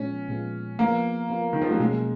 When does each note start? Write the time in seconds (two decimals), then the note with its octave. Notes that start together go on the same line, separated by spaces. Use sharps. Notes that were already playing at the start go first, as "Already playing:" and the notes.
Already playing: A#2 F3 G#3 B3 C#4 F4
0.28 A#2 F3 G#3 B3 F4
0.79 F3 A#3 B3 F4 A#4
1.29 F3 B3 F4 A#4
1.53 D#3
1.62 F3
1.71 F#3
1.79 B2 G#3 A#3 C#4 G#4